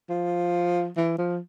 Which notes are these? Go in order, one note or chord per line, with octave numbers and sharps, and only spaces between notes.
F3
E3
F3